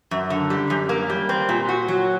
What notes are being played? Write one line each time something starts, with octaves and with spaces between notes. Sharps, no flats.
F#2
D3
G3
F#2
A#3
G3
C4
A#2
F#4
F#3